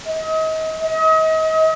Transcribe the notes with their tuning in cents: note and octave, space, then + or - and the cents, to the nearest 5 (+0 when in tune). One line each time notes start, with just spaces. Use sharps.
D#5 +35
D#5 +35